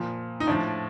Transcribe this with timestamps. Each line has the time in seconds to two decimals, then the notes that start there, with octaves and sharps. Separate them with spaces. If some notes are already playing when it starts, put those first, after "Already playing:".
Already playing: A#2 F3
0.40 D#4
0.47 A2 F3 D4